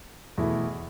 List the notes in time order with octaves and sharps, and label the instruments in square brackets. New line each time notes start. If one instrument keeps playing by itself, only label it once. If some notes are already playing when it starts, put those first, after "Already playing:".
[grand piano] E2 B2 A3 E4